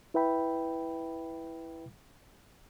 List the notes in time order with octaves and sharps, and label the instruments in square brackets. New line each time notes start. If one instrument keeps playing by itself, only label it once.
[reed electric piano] E4 B4 E5 G5 B5